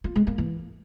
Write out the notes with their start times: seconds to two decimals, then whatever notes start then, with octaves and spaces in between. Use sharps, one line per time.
0.04 F4
0.16 G#3
0.27 A#3
0.38 E3